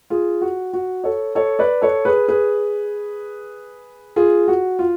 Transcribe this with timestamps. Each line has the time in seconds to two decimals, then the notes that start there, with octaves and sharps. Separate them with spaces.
0.10 F4 G#4
0.41 F#4
0.73 F#4
1.04 A4 C#5
1.35 A4 C#5
1.59 B4 D5
1.82 A4 C#5
2.05 G#4 B4
2.28 G#4 B4
4.16 F4 G#4
4.48 F#4
4.79 F4